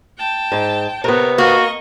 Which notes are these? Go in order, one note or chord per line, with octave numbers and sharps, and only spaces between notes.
G5 A5
G#2
C3 B3 A#4 C#5
A#3 F#4 D#5 C#6